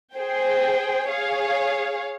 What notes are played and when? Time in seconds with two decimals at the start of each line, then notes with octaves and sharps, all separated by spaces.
0.16 G#4 C5 G5
1.09 G#4 C#5 F5